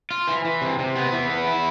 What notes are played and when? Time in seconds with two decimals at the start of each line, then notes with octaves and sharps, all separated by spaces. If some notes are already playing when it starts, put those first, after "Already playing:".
0.11 F4
0.28 E3
0.45 E3
0.61 C3
0.79 C3
0.95 B3
1.13 E3
1.30 B3
1.47 E4